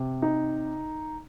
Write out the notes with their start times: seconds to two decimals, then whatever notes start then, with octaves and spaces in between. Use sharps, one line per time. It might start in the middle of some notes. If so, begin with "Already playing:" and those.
Already playing: C3
0.22 D#4